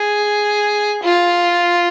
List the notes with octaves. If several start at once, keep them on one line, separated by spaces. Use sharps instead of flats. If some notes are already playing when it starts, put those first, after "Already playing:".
Already playing: G#4
F4